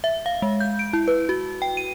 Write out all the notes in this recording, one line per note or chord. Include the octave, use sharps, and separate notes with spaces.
E5
F5
G#3
G6
D7
E4
B4
F#4
G5
D#7